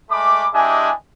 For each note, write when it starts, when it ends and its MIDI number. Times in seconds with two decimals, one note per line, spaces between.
0.10 0.45 56
0.10 0.45 57
0.10 0.45 83
0.10 0.45 86
0.53 0.90 56
0.53 0.90 62
0.53 0.90 64
0.53 0.90 67
0.53 0.90 75
0.53 0.90 80